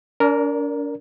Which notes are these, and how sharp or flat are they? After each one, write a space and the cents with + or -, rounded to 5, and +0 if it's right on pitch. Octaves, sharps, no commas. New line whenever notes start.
D4 -40 A#4 +0 D5 +0